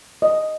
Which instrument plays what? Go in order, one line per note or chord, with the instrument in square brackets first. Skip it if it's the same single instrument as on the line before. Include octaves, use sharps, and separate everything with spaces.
[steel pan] D#5